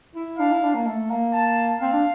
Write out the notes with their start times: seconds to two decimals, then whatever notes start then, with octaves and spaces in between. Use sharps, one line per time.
0.15 E4
0.39 D4 F5
0.51 E4
0.63 D4
0.75 A#3
0.86 A3
1.10 A#3
1.33 A5
1.80 C4 F5
1.93 D4